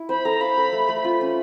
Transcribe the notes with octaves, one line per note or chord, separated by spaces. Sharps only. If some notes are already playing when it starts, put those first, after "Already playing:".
Already playing: E4
C5 B5
A4 A#5
F5 B5
A4
A3
A3
F4
C#4